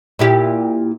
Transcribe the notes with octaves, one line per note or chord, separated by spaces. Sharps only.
A#2 E4 G4